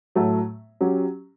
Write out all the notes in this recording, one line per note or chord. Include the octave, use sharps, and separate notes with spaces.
A2 F#3 A3
F#3 C#4 G4